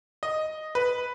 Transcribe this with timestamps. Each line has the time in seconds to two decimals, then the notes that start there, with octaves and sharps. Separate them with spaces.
0.23 D#5
0.75 B4